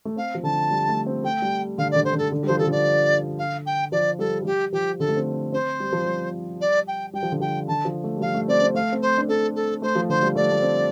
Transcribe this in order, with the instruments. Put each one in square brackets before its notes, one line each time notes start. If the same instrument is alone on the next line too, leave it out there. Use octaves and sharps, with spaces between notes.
[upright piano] A3
[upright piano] C4 [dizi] F5
[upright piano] F3
[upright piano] D3 [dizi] A5
[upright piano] G3
A3
C4
[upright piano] A3 [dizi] G5
[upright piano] G3
[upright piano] D3 [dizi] F5
[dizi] D5
[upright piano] D3
[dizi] C5
[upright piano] D3
[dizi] A4
[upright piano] D3
G3
[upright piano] F3 [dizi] C5
[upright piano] F3 [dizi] A4
[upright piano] D3 [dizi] D5
[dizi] F5
G5
[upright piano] F3 [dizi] D5
[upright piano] G3 [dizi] A4
[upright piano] F3
[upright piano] G3 [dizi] G4
[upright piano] F3 [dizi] G4
[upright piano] D3 [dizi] A4
[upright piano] A3
C4
[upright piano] C4 [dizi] C5
[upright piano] G3
F3
G3
[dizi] D5
G5
[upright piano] G3 [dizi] G5
[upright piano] F3
D3
[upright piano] F3 [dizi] G5
[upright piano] D3 [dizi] A5
[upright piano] F3
A3
G3
[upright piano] F3 [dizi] F5
[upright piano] A3
[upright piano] C4 [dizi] D5
[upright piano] C4
[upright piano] A3 [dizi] F5
[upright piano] C4
[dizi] C5
[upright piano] D4
[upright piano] C4 [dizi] A4
[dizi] A4
[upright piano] A3 [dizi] C5
[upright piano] F3
[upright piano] D3 [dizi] C5
[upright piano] G3
[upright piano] A3 [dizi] D5
[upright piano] A3
C4